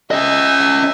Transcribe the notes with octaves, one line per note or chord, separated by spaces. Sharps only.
C#4 D#5 E5 G#5